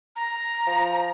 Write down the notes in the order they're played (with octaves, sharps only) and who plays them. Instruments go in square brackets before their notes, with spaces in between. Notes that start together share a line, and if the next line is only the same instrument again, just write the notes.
[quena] A#5
[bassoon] F3